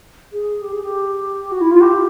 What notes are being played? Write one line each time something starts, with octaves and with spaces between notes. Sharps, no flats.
G#4
G4
G#4
G4
F#4
E4
F4
G4